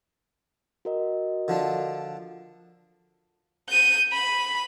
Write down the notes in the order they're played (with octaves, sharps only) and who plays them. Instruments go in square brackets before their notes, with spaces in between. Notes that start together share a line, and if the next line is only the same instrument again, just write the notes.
[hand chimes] F#4 A#4 D#5
[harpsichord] D3 F3 D4
[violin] G6 D#7
B5